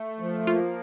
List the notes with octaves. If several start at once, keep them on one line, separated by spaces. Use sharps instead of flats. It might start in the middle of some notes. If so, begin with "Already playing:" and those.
Already playing: A3
F3
A#3 F4